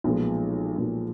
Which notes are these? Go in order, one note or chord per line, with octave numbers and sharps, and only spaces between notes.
B1 A#2 F3 G#3 B3
B1 A#2 F3 G#3 B3